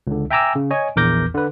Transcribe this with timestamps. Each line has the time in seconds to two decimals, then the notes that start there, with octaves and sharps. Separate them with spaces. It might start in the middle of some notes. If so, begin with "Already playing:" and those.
0.07 C#2 D3
0.31 E5 G5 G#5 A#5 D6 E6
0.55 C#3
0.71 C#5 D#5 G#5
0.96 A#1 E2 A#4 D6 G6 A#6
1.34 D3 B4